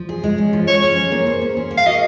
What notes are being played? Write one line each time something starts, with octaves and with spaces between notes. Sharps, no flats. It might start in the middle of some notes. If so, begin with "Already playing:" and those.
Already playing: F3
G#4
G#3
C#4
F3
C5 C#5
C#4
G#4
A#3
C5
C#4
G#4
A#3
F5
F#4 D#5